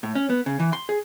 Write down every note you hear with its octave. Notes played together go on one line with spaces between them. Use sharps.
A2
C#4
B3
C#3
E3
C6
G#4